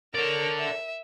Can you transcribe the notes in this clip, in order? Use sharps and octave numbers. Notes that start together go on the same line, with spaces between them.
A4 A#4 C#5 D5
E5